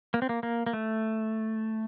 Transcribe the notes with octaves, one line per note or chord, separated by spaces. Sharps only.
A#3
C4
A#3
A#3
A#3
A3